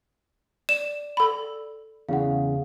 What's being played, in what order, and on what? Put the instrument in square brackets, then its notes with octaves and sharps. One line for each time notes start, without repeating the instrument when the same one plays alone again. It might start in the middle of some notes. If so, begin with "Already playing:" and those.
[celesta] D5 [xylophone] E7
[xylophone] A4 B5
[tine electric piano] E2 C#3 [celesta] F5 F#5